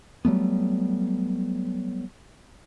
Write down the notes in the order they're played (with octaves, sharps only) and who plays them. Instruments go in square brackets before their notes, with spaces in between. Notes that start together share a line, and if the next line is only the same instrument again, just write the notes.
[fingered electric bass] F#3 G3 A3 B3